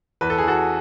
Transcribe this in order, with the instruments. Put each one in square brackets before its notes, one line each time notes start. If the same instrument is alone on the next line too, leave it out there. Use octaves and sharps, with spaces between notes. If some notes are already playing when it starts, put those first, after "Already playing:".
[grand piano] E2 B4
A4
G#4
E2 F#4 A4